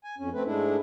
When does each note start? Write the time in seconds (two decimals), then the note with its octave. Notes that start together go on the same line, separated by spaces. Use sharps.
0.04 G#5
0.18 F2 C#4
0.33 A3 C4 B4
0.45 G#2 G#3 A3 D4 E4